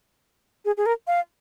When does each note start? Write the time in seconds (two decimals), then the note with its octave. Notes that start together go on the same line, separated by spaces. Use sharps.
0.65 G#4
0.77 G#4
0.86 A#4
1.07 F5